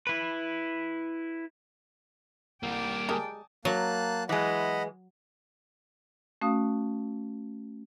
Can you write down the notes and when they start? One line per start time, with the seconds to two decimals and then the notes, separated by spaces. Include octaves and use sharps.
0.07 E4 B4
2.63 C2 G3 A#3 D5 G5
3.09 G#3 G4 A#4 G#5 A5 D#6
3.65 F#3 A#3 A5 F#6
4.29 E3 G#3 D#5 F#5 B5
6.41 A3 C#4 F#4 F5 D#6